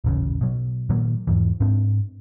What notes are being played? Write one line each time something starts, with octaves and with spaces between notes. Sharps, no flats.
D#1 A1 C#3
B2 F#3
A#2 D#3 F#3 A#3
E2 G#2 E3
G#2 C4 D4